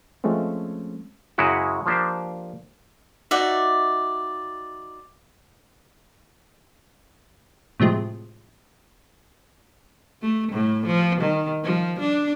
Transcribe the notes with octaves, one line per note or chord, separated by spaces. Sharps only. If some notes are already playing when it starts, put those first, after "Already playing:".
F3 G#3 A3 C4 C#4
F#2 C#3 G#3 E4 F#4
F3 A#3 D4 G4 C5
D#4 F#4 D5 E5
A2 C3 F3 G#3
A3
A2
F3
D#3
F3
D4